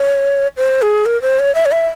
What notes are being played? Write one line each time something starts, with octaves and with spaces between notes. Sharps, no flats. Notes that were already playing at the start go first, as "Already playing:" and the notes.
Already playing: C#5
C5
G#4
A#4
C5
C#5
E5
C#5
E5